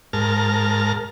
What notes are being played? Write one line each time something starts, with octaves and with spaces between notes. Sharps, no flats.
G#2 A#4 A5 F6